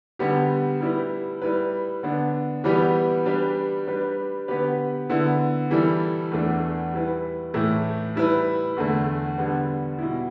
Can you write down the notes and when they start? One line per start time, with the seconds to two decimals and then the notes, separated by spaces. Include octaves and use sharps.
0.19 D3 G3 B3 G4
0.81 G3 E4 G4 B4
1.42 G3 E4 B4
2.03 D3 B3 D4
2.64 E3 G3 B3 G4 B4
3.26 G3 D4 G4 B4
3.87 G3 D4 G4 B4
4.48 D3 B3 G4 B4
5.10 D3 B3 E4
5.71 E3 G3 E4 A4
6.32 E2 E3 A3 D4
6.93 G3 E4 B4
7.54 A2 E3 A3 E4
8.16 G3 E4 B4
8.77 E2 D3 A3
9.38 D3 G3 B3 D4
9.99 B2 G3 E4